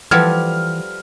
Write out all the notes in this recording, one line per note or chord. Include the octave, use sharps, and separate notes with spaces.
E3 F3 G3 A4 B4 F#5 F6 G#6